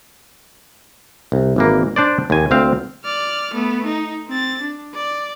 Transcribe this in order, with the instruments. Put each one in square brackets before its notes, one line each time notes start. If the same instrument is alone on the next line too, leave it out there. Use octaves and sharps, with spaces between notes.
[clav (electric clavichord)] C2
G#1 E3 A#3
D4 C5 D5
D#2 G#5
D2 C4 F5
[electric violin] D5 F6
A3 B3
D#4
C4 A6
D4
D5